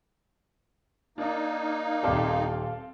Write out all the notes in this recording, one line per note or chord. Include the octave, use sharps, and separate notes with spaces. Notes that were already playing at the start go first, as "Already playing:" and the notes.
A#3 D4 D#4
D#1 C4 G4 A4 D5 F5